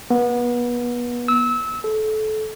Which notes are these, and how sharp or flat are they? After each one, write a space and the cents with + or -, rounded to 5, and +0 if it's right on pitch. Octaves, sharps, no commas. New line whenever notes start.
B3 -30
E6 -25
A4 -25